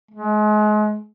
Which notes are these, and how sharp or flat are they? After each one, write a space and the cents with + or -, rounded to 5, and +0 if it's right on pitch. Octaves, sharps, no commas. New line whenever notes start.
G#3 +35